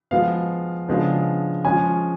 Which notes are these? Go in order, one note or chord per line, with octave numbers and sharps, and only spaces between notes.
F3 G#3 B3 F5
C#3 F3 G#3 B3 D4
F3 G#3 C#4 F4 G#5